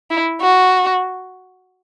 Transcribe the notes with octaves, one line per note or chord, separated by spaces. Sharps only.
E4
F#4